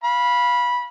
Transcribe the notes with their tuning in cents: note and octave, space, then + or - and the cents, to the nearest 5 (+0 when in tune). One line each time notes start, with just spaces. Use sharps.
F5 +0 B5 -15